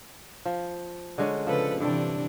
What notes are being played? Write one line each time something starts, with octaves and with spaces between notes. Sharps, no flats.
F3
D3 G#3 C#4
C#3 F3 A4 B4
G2 C3 E3 D4 A4 G5